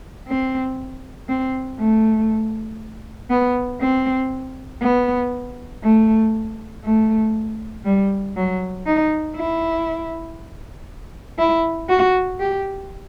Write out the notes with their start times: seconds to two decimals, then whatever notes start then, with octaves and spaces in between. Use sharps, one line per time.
0.28 C4
1.29 C4
1.79 A3
3.30 B3
3.81 C4
4.82 B3
5.83 A3
6.84 A3
7.85 G3
8.36 F#3
8.86 D#4
9.36 E4
11.38 E4
11.89 F#4
12.40 G4